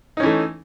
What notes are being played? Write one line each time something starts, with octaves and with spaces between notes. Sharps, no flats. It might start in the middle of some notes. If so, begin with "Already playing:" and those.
E3 A3 C#4 D#4